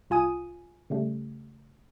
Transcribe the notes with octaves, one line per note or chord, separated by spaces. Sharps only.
C2 F4 G#5 D#6 D#7
C#3 G3 A3